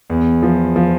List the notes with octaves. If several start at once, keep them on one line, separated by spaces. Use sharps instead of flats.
E2
F3
F3